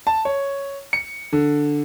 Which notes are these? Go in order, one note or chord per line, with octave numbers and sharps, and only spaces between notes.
A5
C#5
C#7
D3